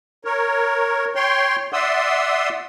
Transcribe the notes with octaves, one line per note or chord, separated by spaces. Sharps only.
A#4 C#5
C#5 G5 C6
D5 E5 F#5 C6 D#6 E6